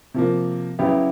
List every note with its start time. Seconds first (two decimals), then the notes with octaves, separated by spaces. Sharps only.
0.14 C3 F3 A#3
0.79 C#3 F#3 B3 E4 G4